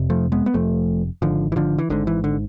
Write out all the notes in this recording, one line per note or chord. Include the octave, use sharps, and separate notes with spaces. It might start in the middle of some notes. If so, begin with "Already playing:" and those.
Already playing: F1 F2 C3
F3 A3
G#3 B3
B3
F1 F2 C3 F3 A3
G#1 G#2 D3 F3
E3
D3 F3
E3
G#1 G#2 D3
E3
D3